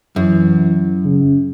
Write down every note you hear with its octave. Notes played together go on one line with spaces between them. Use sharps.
F#2 E3
C#3